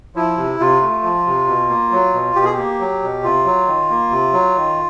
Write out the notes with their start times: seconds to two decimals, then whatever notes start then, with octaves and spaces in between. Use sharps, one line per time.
0.15 F3 E4
0.37 C3
0.60 C3 F4
0.81 A3
1.03 F3
1.26 C3
1.48 B2
1.69 A#3
1.91 F#3
2.14 B2
2.36 B2 G4
2.45 G#4
2.53 A#3 G4
2.80 F#3
3.02 B2
3.23 C3 F4
3.45 F#3
3.67 D#3
3.90 A#3
4.11 C3
4.33 F#3
4.56 D#3